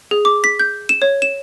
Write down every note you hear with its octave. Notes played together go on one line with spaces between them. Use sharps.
G#4
D6
B6
G6
E7
C#5
E7